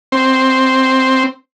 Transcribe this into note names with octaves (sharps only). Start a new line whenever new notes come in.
C4